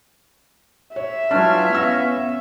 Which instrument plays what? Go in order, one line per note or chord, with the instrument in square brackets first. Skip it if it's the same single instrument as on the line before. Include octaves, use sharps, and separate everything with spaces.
[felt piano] C#5 [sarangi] E5
[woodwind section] E3 C#5 F6 [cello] F#3 F4 [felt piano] D4
[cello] B3 C#4 [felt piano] F5 E6 A#6